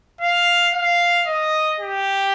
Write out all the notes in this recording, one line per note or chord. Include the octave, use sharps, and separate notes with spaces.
F5
F5
D#5
G4